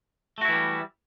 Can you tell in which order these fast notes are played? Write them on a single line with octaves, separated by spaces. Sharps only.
A3 F#4 E4 E3 G3